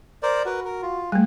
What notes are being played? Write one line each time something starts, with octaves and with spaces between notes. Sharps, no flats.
A#4 C5 D5
F#4 A#4 B4
A#4
F4
G3 A3 G#4